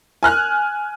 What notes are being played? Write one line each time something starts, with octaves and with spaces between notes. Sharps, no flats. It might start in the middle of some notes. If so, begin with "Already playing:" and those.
G#5 F6 F#6